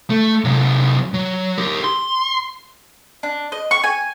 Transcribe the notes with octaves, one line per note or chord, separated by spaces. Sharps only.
A3
C3 F#3
F#3
G4 A#4
C6
D4
D#5
C#6
G#5